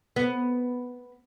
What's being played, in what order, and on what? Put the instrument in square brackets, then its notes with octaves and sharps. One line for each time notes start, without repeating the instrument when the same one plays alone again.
[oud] B3